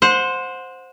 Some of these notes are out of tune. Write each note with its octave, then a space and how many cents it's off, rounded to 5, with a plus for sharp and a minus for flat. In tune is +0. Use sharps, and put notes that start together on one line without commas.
C5 +0 F#5 -25